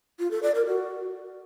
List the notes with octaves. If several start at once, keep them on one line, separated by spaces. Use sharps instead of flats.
F4
A4
D5
A#4
F#4